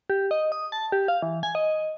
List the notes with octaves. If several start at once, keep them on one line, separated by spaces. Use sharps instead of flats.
G4
D#5
D#6
A5
G4
F5
E3
G#5
D#5